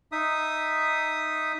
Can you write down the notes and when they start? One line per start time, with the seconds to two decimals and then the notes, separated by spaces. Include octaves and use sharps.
0.12 D#4 E5 D#6